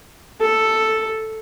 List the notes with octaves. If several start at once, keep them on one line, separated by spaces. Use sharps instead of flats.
A4